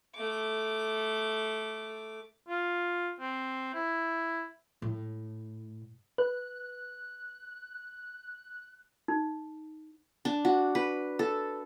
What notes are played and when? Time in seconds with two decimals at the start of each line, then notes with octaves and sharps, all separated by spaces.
0.15 A3 D6
2.49 F4
3.20 C4
3.74 E4
4.82 A2
6.18 B4 F#6
9.08 D#4
10.25 D4
10.45 F#4
10.75 B4
11.19 A4